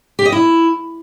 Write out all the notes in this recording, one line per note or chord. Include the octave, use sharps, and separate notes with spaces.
G4
D#5
E4